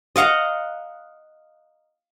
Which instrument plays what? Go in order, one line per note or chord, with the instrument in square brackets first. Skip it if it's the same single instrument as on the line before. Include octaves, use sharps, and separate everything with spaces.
[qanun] D#5 F5 F#5 A#5